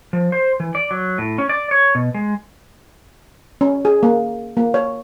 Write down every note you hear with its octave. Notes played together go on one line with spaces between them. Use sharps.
F3
C5
E3
D5
F#3
A2
C#4
D5
C#5
B2
G#3
C#4
G#4
A#3
A#3
C#5